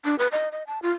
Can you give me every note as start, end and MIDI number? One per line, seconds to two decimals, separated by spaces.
0.05 0.16 62
0.19 0.28 71
0.32 0.49 75
0.52 0.63 75
0.67 0.81 81
0.82 0.91 65